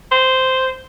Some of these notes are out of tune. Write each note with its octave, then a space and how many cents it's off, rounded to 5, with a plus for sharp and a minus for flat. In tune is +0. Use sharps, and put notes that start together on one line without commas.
C5 -10